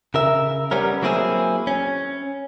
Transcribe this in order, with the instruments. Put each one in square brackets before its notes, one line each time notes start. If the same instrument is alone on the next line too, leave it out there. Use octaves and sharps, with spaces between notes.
[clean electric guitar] C#3 A#4 E5
G3 B3 C#4 A#4
F#3 A#3 C4 E4 G#4
C#4